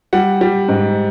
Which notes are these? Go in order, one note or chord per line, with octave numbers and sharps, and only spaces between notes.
G3 F#5
G3
G#2